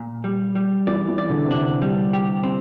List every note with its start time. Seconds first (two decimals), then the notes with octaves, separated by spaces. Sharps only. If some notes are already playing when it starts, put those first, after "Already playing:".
Already playing: A#2
0.24 G3
0.55 G3
0.87 E3 D5
1.08 E3
1.18 D5
1.30 D3
1.46 C3
1.50 D3 D4
1.82 G3
2.13 G4
2.43 C4